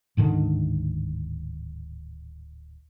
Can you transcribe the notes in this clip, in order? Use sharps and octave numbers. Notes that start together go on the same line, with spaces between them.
D1 G#2 D3 D#3